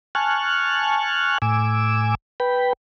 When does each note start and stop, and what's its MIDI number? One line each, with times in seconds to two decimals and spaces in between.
0.15 1.38 80
0.15 1.38 81
0.15 1.38 85
0.15 1.38 89
0.15 1.38 90
1.42 2.15 45
1.42 2.15 80
1.42 2.15 86
1.42 2.15 88
2.40 2.73 71
2.40 2.73 79
2.40 2.73 83